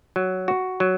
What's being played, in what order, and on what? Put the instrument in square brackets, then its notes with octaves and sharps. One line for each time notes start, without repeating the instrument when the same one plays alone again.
[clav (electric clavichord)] F#3
F#4
F#3